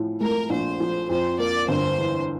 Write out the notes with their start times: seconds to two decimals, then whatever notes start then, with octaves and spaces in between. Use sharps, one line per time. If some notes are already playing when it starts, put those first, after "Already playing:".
Already playing: A2 F3
0.21 A3 A#4
0.50 A#1 C5
0.80 F3
1.09 F2 C5
1.39 A#3 D5
1.68 G1 C5
1.98 E3